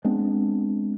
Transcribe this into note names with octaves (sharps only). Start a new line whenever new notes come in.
G#3 B3 C4 D4